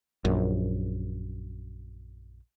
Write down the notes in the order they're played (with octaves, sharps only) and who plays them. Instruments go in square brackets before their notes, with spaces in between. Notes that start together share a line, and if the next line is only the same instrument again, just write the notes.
[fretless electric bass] A#1 F#2